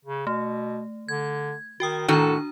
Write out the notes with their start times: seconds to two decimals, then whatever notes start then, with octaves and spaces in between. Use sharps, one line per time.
0.05 C#3
0.27 B2 A3
1.08 D3 G#6
1.80 D#3 F#4 G5 D#6
2.08 A2 D#3 D4 F#4 A4 A#5